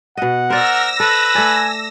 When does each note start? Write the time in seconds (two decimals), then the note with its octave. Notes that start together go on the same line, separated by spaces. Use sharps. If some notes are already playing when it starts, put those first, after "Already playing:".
0.17 B2 D#5 F#5
0.50 A#4 C5 D5 E6 A#6
1.00 A4 B4
1.35 A3 D5 G#5